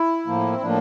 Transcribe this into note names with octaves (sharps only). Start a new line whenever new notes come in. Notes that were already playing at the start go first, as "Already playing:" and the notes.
Already playing: E4
A2 F3 A#3
C4
A2 F3 A#3 D4